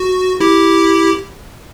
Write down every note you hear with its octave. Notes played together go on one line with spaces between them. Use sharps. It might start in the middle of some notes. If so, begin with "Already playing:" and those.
Already playing: F#4
E4 G4